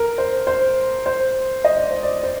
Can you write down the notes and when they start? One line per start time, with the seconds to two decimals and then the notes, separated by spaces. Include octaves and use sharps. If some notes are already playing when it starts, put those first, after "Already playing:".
Already playing: A#4
0.18 C5
0.47 C5
1.06 C5
1.64 D#5
1.77 D5
1.91 C5
2.03 D5
2.23 C5